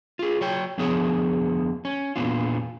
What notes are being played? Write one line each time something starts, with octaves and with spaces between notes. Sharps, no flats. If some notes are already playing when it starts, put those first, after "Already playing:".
F4 G#4
F#3 C#5 G5
F2 D3 F3 B3 G#4 C#5
C#4
E2 A#2 B3 D4 F4